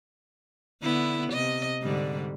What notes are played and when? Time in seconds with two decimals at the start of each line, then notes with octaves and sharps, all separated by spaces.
0.83 D3 B3 E4
1.32 C3 D#5
1.83 G#2 D3 G3